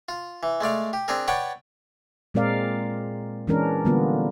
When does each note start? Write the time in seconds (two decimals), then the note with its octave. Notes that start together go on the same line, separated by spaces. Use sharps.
0.09 F4
0.43 E3
0.61 G#3 A3 D5 F5
0.93 G4
1.08 C4 D4 G#4 A#4
1.28 B4 C#5 D5 F#5 G5 A5
2.34 A#2 G#3 C4 A#4 D5 F5
3.47 E3 G#3 C#4 D4 A#4
3.85 D3 G3 A#3 B3 F4